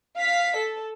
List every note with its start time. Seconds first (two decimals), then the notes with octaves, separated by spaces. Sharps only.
0.18 F5 B6
0.56 A4